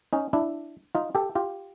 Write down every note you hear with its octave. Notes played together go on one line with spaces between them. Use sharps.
C#4 D#4
D4 E4
D#4 F4
G4 A4
F4 G4